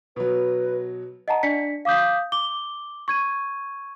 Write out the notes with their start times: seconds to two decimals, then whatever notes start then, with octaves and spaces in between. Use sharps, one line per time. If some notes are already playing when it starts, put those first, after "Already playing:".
0.16 B2 F#3 B4
1.28 D#5 F#5 A5 A#5
1.43 D4 D5 B6 C#7
1.85 F5 D6 D#6 G6 B6
2.32 D6 G7
3.08 C#6 G#6 D#7